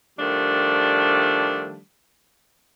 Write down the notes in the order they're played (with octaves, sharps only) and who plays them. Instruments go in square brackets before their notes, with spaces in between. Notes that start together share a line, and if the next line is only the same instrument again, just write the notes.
[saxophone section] D#3 F3 G3 A3 D4